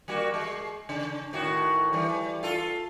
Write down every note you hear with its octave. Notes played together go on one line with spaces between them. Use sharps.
G3 A#3 F#4
G#3
C#3
A2 D#3 F#4
E3 G3
F4 A4